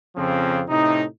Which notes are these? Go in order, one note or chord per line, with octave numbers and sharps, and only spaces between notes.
F2 C#3 F3 C4
A2 C3 D#4